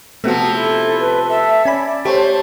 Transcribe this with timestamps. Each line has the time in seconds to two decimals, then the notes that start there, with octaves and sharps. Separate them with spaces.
0.24 C3 F3 A3 B3 F#4
0.56 E4 A4
1.00 A4 B4
1.29 A4 E5
1.65 C#4 D5 G#5 B5
2.05 A3 G4 C5 C#5